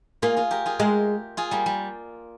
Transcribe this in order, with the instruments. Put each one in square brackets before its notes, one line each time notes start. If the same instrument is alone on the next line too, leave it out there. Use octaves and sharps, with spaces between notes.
[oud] A#3 [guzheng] F4 G#4
[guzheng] F4 G#4
G4 A#4
F4 G#4
[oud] G#3 [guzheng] G4 A#4
[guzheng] F4 G#4
G3 A#3
G3